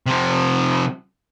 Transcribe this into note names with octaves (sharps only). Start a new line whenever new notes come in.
C3 F3